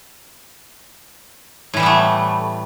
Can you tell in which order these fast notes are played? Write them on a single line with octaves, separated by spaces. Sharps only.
A2 E3 G3 B3 A3